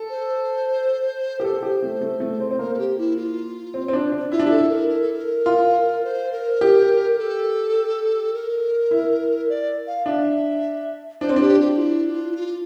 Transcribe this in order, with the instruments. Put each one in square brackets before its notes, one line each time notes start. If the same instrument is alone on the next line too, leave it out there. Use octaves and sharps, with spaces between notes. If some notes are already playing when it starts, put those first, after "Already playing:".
Already playing: [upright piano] A4
[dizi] C5
[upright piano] G4 [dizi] A#4
[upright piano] A4 [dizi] C5
[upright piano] G4
A3
A3
A3
C4
C4
[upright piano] A#3 [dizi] A#4
[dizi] A4
G4
E4
F4
[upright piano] C4
C4
D4
D4
[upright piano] E4 [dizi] F4
[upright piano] D4
[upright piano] E4 [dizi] G4 A4
[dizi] A#4
A#4
A4
A#4
[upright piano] F4
[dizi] C5
A#4
[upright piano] G4
[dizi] A#4
A4
A#4
[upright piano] E4
[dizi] D5
F5
[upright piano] D4 [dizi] E5
[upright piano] D4 [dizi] C5
[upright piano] C4
[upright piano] D4 [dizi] G4
[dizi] F4
F4
E4
F4
E4
F4